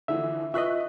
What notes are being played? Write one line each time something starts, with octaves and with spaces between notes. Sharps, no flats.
D3 E3 F3 A4 E5
F4 B4 D#5 E5 C#6 F#6 B6